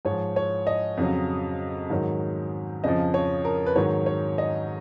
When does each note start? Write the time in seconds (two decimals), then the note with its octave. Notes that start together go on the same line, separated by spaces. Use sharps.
0.05 G#2 C#5
0.10 F3
0.36 C#5
0.67 D#5
0.97 F2 C#3 F#3
1.90 G#2 D#3 F#3
2.84 F2 C#3 F3 D#5
3.14 C#5
3.45 A#4
3.66 B4
3.76 G#2 D#3 F#3 C#5
4.06 C#5
4.38 D#5